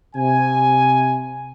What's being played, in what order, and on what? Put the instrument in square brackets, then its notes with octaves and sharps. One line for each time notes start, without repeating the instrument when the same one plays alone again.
[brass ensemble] C3 G#5